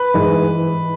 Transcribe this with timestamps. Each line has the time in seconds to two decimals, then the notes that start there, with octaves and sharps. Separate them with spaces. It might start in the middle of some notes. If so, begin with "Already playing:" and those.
Already playing: B4
0.14 G#2 E3 G#3